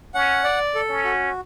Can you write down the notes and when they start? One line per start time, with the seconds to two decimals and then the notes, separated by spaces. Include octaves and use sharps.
0.14 C#4 F#5
0.44 D5
0.75 A4
0.89 C#4
1.04 F#4